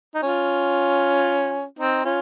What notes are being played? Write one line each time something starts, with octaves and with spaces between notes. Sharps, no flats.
D#4
C#4 F4
C4 D#4
C#4 F4